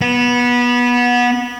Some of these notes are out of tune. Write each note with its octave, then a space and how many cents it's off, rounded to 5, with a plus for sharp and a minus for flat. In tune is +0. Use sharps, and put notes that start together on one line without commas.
B3 -20